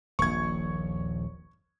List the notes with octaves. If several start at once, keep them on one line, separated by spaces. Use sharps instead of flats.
D#1 A#1 C#6 G#6